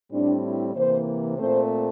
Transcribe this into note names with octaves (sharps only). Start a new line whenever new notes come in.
A2 G3 C4 D4
E4
C3 E3 A#3 C5
A#2 A3 C4 C5